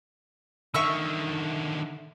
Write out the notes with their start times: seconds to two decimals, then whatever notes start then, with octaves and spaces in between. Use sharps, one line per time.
0.74 D3 D#3 E5 C#6 E6